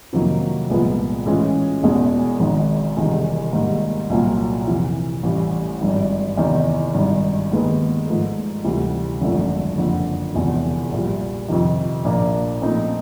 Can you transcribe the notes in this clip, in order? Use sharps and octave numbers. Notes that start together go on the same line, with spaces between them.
F2 C3 D#3 F#3 A#3
C2 A#2 F3 G#3 B3
A2 E3 G#3 C#4 F4
E1 E2 B2 G#3
G#1 G#2 D#3 G#3
E1 E2 C3 D#3 G3
G#2 D#3 G3 A#3
C2 A#2 F#3
F2 C3 E3
A1 A2 E3 G3
G#1 G2 D#3
E2 C3 D#3
G#1 G2 D#3
D#2 D#3 G#3 B3
G#2 F3 A3
D2 C3 E3 G3
G#1 F#2 D3 F3 A3
F#1 F2 D3
E1 E2 C3 F3
A#1 A#2 G3
F2 C3 D#3
A#1 A#2 F3 A#3 D4
A#2 F3 A3 C4 D#4